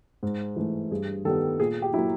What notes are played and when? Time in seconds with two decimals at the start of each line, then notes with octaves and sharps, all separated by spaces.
0.23 G#2
0.56 E3 A3
0.91 G2 G#4
1.25 D#3 G3 B3 A4
1.59 A#2 G#4
1.82 G4
1.93 F#3 A#3 E4